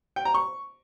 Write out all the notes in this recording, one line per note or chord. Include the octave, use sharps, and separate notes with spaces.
G5
A#5
C#6